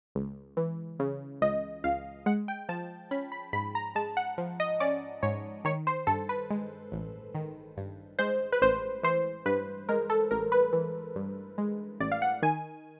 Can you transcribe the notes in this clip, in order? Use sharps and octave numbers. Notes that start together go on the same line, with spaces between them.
C#2
E3
C#3
C#2 D#5
C#2 F5
G#3 F#5
G5
F3 A5
C#4 B5
B5
G#2 B5
A#5
G#3 A5
F#5
F3
D#5
C#4 D5
G#2 C#5
D#3 C#5
C5
G2 A4
B4
G#3
A1
D#3
G2
G#3 C5
B4
A1 C5
E3 C5
G2 B4
G#3 A#4
A4
A1 A#4
B4
E3
G2
G#3
A1 D5
F5
F#5
D#3 G#5